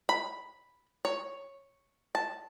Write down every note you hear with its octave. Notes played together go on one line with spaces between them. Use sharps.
B5
C#5
A5